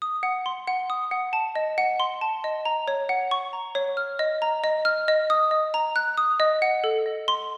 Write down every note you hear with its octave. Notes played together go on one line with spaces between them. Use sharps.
D#6
F#5
C6
F#5
D#6
F#5
A5
D#5
F#5
C6
A5
D#5
A#5
C#5
F#5
C#6
A#5
C#5
F6
D#5
A#5
D#5
F6
D#5
D#6
D#5
A#5
F#6
D#6
D#5
F#5
A4
D#5
C6